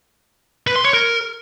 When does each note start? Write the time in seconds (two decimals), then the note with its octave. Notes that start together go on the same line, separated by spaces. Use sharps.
0.67 B4
0.76 C6
0.84 C#5
0.93 A#4